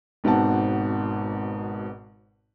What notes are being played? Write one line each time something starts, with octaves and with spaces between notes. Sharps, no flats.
G#1 G#2 B2 C4 F#5 A5